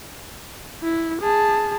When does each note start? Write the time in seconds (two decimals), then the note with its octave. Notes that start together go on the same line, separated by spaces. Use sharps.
0.83 E4
1.22 G#4 A5